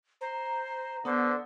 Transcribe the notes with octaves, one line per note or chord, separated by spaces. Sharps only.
C5 A#5
D3 B3 C5